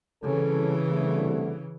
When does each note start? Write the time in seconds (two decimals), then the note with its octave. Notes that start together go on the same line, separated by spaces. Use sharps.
0.23 C2 C#3 E3 C#4 A4
0.90 C2 D3 A3